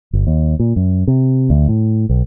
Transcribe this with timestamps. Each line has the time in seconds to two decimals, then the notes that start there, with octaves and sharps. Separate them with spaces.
0.13 G1
0.27 D#2
0.59 A#2
0.76 F#2
1.07 C3
1.50 D2
1.69 A2
2.09 B1